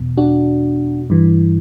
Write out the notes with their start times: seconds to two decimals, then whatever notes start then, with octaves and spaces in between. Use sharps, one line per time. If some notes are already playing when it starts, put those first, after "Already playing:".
Already playing: E2 B2
0.17 D4 F#4
1.10 G2 E3